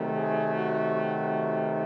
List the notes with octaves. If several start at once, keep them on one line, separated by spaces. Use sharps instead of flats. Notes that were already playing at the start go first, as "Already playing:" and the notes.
Already playing: C3 D#3 F#3 A3
G#4
F#4
F#4